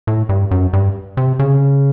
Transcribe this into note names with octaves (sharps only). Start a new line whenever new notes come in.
A2
G2
F#2
G2
C3
C#3